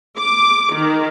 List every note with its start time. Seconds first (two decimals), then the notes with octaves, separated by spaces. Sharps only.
0.18 D6
0.73 D#3